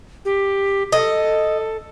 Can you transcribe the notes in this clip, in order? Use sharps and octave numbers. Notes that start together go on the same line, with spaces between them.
G4
A4 D#5